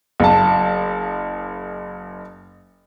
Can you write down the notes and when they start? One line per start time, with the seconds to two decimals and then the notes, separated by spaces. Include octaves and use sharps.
0.20 F#1 A5